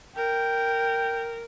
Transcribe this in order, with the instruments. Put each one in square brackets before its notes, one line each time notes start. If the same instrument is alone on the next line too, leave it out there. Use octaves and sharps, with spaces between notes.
[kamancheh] A#4 [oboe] G5